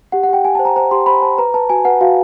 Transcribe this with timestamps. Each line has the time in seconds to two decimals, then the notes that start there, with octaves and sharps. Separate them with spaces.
0.12 G4 F#5
0.23 F#5
0.29 G4 G5
0.44 G4 G#5
0.55 A5
0.59 C5
0.65 A#5
0.76 C5 A#5
0.91 G4 C6
1.06 C5 B5
1.22 C5 A5
1.38 B4 A#5
1.54 B4 A5
1.70 F#4 G#5
1.85 B4 F#5
2.01 F#4 F5